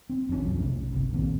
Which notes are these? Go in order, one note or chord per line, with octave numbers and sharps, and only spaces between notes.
C4
D#1 A#1 C3 C#4
B1 F2 F3 F#3
B1 C3 A3 C#4
G1 C2 C3
A#1 D#2 A#2 C4